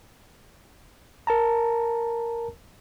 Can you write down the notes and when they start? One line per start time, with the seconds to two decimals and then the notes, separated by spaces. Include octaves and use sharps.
1.27 A#4 A5 A#5